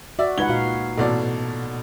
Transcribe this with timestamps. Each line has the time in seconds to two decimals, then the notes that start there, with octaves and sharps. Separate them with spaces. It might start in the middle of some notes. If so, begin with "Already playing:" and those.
0.19 F#4 D5 E5
0.38 C#2 D#4 B4 F#5 G#6 G7
0.49 A#2 F#4 F5
0.98 A1 B2 A4 D5